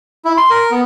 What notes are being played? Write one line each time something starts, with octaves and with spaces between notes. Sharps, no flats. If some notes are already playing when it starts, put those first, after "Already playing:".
E4
C6
A#4
B3